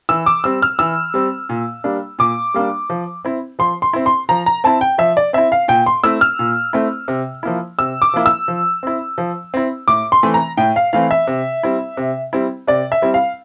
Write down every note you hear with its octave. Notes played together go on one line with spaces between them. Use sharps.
E3 E6
D6
G3 C4 E6
F6
E3 E6
G3 C4
A#2
G3 A#3 D4
A#2 D6
G3 A#3 D4
F3
C4 E4
F3 C6
C6
C4 E4
C6
F3 A#5
A#5
C4 E4 A5
G5
F3 E5
D5
C4 E4 E5
F5
A#2 G5
C6
A3 C4 E4 E6
F6
A#2
A3 C4 E4
C3
F3 A#3 E4
C3 E6
D6
F3 A#3 E4
E6
F3
C4 E4
F3
C4 E4
A2 D6
C6
E3 A3 C4
A#5
A2 G5
F5
E3 A3 C4 F5
E5
C3
G3 C4 E4
C3
G3 C4 E4
C3 D5
E5
G3 C4 E4
F5